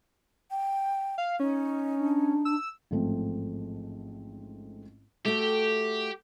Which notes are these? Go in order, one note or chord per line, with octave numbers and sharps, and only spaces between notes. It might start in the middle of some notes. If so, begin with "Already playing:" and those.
G5
F5
C#4 D#4
D4
E6
A1 G#2 F3 A3 C4
A3 F#4 G4